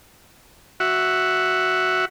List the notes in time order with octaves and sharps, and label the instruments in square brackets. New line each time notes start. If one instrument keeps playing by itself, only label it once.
[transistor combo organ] F#4 E5 F#5